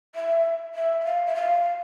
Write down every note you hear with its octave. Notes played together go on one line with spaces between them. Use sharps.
E5
E5
E5
F5
E5
F5